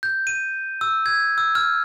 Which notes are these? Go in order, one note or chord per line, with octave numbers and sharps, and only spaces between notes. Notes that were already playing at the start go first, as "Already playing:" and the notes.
G6
D#7
E6
G#6
E6
F6